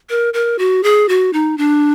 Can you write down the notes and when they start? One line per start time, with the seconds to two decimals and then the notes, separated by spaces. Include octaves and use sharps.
0.10 A#4
0.34 A#4
0.59 F#4
0.83 G#4
1.09 F#4
1.33 D#4
1.58 D4